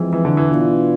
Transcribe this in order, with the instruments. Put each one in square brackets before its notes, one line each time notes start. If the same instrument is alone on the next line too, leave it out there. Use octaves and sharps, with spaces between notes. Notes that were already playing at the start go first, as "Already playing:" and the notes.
Already playing: [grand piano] E3 [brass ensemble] F3 G#3 C4
[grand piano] E3
D3
E3
[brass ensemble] B2 B3 D4 F4